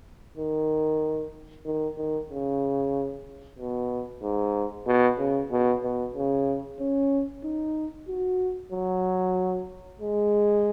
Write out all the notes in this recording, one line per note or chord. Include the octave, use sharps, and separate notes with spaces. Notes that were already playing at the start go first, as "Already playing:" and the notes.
D#3
D#3
D#3
C#3
B2
G#2
B2
C#3
B2
B2
C#3
C#4
D#4
F#4
F#3
G#3